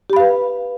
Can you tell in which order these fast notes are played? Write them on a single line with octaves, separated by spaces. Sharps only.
G4 B5 F5 B4